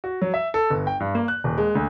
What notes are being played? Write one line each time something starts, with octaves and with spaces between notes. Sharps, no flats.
F#4
F#3
E5
A4
G1
G5
G2
A#3
F#6
D#1
G#3
D2